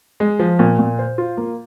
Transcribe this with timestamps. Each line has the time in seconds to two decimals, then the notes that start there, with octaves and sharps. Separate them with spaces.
0.20 G#3
0.39 F3
0.59 A#2
0.79 A#2
0.99 C5
1.18 F4
1.37 A#3